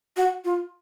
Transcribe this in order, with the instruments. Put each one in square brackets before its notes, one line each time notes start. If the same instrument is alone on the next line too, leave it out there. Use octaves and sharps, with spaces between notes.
[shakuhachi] F#4
F4